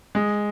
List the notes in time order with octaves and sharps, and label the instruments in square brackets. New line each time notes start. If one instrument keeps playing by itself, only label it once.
[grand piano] G#3